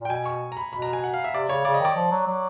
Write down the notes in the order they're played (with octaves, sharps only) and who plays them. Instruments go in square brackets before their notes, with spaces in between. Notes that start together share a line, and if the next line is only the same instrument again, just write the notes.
[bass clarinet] A#2 [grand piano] G5
[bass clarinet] B2 [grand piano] G#5
[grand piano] C#6
A#5
B5
[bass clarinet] B2 [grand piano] B5
[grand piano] A#5
G#5
F#5
F5
E5
[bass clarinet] C3 [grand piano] D5
[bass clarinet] C#3 [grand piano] C#5
[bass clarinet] C#3 [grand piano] D5
[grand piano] D#5
[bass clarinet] D#3 [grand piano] D5
[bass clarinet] F3
F#3
F#3